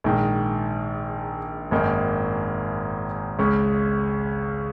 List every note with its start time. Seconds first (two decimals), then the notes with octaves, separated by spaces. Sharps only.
0.04 A#1 G#2 D#3
1.71 G#1 F#2 D#3 A#3 D#4
3.38 C#2 C#3 G#3 C#4